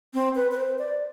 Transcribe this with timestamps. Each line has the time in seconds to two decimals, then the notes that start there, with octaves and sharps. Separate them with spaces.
0.14 C4
0.35 B4
0.51 B4
0.57 C5
0.79 D5